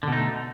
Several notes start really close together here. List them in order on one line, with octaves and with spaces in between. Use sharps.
D3 B2 D#4 A3